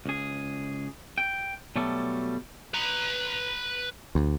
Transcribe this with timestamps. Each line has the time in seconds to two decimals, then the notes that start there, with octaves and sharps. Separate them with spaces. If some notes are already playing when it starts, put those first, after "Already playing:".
0.06 C#2 G#4
1.18 G5
1.76 B2 F#3 G3 A3 A4
2.74 B4 A#5
4.15 D2